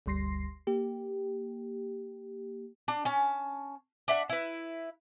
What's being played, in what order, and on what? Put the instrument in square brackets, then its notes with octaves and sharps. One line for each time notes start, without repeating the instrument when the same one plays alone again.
[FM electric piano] G1 D2 G3 C6 A#6 C7
A#3 G4
[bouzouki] D4
C#4 A5
D4 E5 F#5
E4 B4